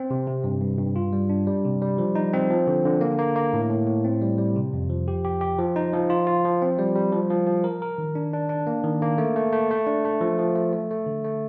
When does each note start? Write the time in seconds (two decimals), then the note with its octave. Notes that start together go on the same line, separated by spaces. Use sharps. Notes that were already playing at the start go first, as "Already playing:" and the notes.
Already playing: C4
0.11 C3
0.28 C3
0.44 G2
0.61 G2
0.78 G2
0.96 F4
1.13 G3
1.30 D4
1.47 G3
1.65 C3
1.81 G3
1.98 F3
2.15 D#4
2.34 C4
2.50 F3
2.67 D3
2.85 D3
3.01 A#3
3.19 A#3
3.36 A#3
3.53 A2
3.70 A2
3.87 A2
4.04 C4
4.22 G3
4.38 G3
4.56 C3
4.73 F2
4.89 F3
5.08 G4
5.25 G4
5.41 G4
5.58 F3
5.76 D#4
5.93 F3
6.10 F4
6.27 F4
6.45 F3
6.62 C4
6.79 G3
6.96 G3
7.12 F3
7.30 F3
7.47 F3
7.64 A#4
7.82 A#4
7.98 D#3
8.15 D4
8.33 D4
8.49 D4
8.67 A#3
8.84 D#3
9.02 A#3
9.18 A3
9.36 A3
9.52 A3
9.70 A3
9.87 D4
10.05 A3
10.21 F3
10.39 F3
10.56 A3
10.73 A3
10.90 A3
11.06 D3
11.24 A3